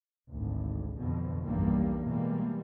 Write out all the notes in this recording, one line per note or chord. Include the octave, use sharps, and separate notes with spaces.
G#1 D2
F2 B2 D3
B1 E2 G2 G3 A#3
B2 E3 G3 G#3 A#3